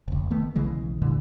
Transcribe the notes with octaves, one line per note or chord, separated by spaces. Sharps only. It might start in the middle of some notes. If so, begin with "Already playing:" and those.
F1 C#2
D#3 A3 B3
B1 C#3 E3 G#3
G2 A#2 D3 E3